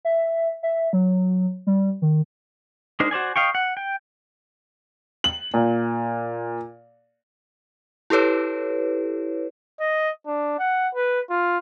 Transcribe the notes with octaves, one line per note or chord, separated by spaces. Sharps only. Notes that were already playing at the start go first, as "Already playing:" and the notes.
E5
E5
F#3
G3
D#3
G#3 D4 D#4 A#4 C5
F#4 C5 D5 G#5
D#5 F5 G5 C#6
F#5
G5
F#7
A#2
E4 G4 A4 B4 C#5
D#5
D4
F#5
B4
F4